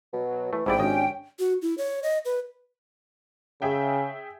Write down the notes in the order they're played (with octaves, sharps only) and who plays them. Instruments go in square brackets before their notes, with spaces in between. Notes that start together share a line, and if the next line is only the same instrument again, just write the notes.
[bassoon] B2 [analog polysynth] F#3
[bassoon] E3 [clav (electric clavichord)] A3
[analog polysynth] A1 G#4 [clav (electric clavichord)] G#2 E4 D5 [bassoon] C3 [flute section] G5
[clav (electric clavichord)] G#1 D#5 [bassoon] C#4 [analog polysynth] D4 G4 G#5
[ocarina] F#4
E4
C#5
D#5
B4
[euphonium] C#3 [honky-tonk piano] G#4 E5 G5